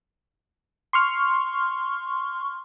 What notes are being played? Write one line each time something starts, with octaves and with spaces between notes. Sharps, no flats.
C6 C#6 F6